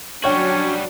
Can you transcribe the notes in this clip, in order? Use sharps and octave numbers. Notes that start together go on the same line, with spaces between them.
F#3 G3 C#4 D4 F#4 C#5 G5